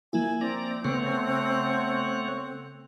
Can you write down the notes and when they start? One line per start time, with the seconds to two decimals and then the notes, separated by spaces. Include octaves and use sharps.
0.13 F3 A#3 E4 G#5
0.41 C4 D5 A#5
0.85 C#3 A3 B3 C#5 F#5